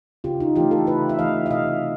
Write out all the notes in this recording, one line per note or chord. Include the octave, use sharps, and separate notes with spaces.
C#3 F4 G4
D#4 F4
E3 A3 F4 G4
G4 A4
C#3 A4 B4
E5
E3 A3 D#5 F5
E5
C3 D#5 F5